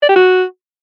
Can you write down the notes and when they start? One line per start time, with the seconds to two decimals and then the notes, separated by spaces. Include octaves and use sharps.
0.02 D5
0.09 G4
0.16 F#4